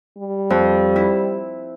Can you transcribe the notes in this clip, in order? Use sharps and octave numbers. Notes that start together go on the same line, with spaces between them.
G3
F2
E4